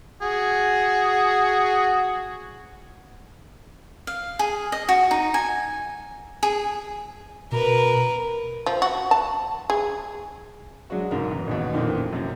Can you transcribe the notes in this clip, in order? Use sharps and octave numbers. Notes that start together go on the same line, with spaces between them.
F#4 G#4
F5
G#4
D#5
F#4
D#4
G#5
G#4
B2 A#4 B4
F3
F#4
A5
G#4
F#3 G#3 D4 F#4
C2 G#2 C#3 A#4
E2
A1 D#2 B2
F2 A#2 D#3 E3 A#3 C4
F#2 C3